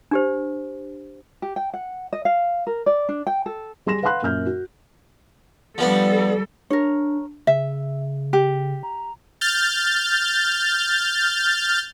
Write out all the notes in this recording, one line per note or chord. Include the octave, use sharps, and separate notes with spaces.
D4 G4 C5
G4
G5
F#5
D#5
F5
A#4
D5
D4
G5
A4
G3 G#4 C6 A#6 E7
B4 F5 F#5 B5 C6 F#6
F#2 A#2 F6 G6
F#4
F3 G3 B3 D4 A4
D4 A#4 C#5
C#3 E5
G4
A#5
F6 G6 A6